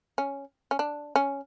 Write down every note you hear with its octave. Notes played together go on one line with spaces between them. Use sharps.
C#4
C#4
D4
C#4